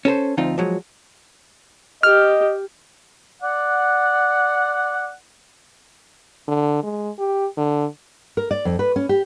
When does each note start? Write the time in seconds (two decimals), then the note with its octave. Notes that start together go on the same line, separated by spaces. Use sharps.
0.05 C#4 A4 A#4 C5
0.37 D2 F3 C4 D#4 F4
0.58 F3 F#3 G#3
2.03 G4 D#5 F6
3.43 D5 F#5
6.48 D3
6.83 G#3
7.19 G4
7.57 D3
8.37 A#4
8.51 D5
8.65 F2
8.79 B4
8.96 C#4
9.09 G4